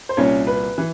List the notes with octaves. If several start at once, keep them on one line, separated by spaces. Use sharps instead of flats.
C5
C2 A#2 C#4 C#5
B4
E3